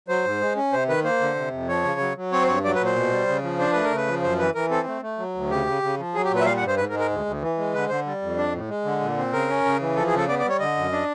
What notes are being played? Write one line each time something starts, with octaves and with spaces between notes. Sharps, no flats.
F#3 C5
G#2
G#3
C#4
C3 C5
D#3 B4
A#3 C5
D3
C3
F2
F3 C#5
C#3
F#3
F#3
C4 C#5
C5
G2 C#5
F#3 D5
B4
A#2
C5
B2
G3
C#3
F3
D4 C5
A3 B4
A#4
C#3 B4
F3
F#2 C5
E3 B4
E3 A#4
C4 A4
A3
A3
F#3
D2
C#3 G4
C#3
C#3
F3
F#3 G#4
G4
A#2
B4
E5
G3 F5
F#5
G2
C5
G#2 B4
A#4
G#3
A#4
D2
D2
E3
G#3
D3 B4
D3 C5
G3
F2
D4
A2
G#3
D3
A#2
C4
C#3 A#4
C#4
C#3
E3
F3 A4
G#4
C#3 A4
B3 D5
D5
G3 C#5
D3 D#5
F#2
D4